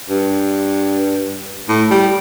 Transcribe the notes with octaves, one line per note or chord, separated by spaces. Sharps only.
G2
A2
G3